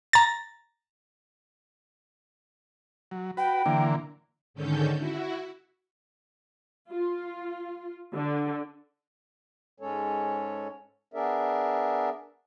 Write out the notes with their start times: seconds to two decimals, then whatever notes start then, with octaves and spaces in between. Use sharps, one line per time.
0.13 A#5 A6
3.11 F#3
3.37 F#4 B4 G5
3.66 D3 E3 A#3
4.54 G#2 D3 D#3 C#4 A4 G6
4.97 E4 F#4
6.90 F4
8.16 D3
9.80 G#2 G#3 C#4 A4 C#5
11.14 B3 D4 G#4 A#4 D5 E5